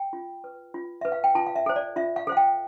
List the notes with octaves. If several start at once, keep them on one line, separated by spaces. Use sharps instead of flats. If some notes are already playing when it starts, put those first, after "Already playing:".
Already playing: G5
F4
B4
F4
B4 E5
F5
G5
F4 A5
F5
E5
A4 C5
D5
F4 E5
F5
A4 C5 F5
G5